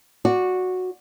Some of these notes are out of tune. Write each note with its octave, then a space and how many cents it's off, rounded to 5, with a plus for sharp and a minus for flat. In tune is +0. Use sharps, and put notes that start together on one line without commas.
F#4 -10 D5 -5